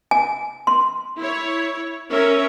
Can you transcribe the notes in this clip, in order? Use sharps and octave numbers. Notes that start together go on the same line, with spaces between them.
G#5
C6
E4 C#5
C#4 A#4 E5